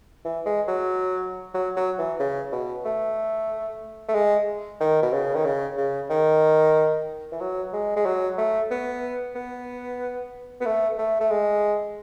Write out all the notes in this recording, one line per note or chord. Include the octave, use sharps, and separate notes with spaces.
E3
G#3
F#3
F#3
F#3
E3
C#3
B2
A3
A3
G#3
D#3
B2
C#3
D#3
C#3
C#3
D#3
E3
F#3
G#3
G#3
F#3
A3
B3
B3
B3
A3
A3
A3
G#3